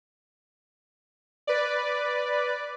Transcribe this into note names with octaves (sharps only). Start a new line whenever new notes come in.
B4 D5